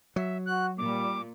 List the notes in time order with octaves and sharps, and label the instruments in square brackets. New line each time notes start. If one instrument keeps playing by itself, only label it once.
[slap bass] F#3 [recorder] E5
[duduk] F#4 [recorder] F#6
[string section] A#2 [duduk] G3 [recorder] D6